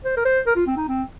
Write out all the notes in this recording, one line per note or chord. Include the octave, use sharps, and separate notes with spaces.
C5
A#4
C5
A#4
F4
C4
D#4
C4